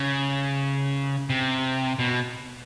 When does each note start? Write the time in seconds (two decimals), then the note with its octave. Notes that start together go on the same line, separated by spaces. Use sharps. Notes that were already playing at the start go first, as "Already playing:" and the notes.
Already playing: C#3
1.30 C3
1.99 B2